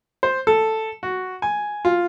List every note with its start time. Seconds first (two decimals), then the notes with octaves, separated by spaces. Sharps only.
0.23 C5
0.47 A4
1.03 F#4
1.42 G#5
1.85 F4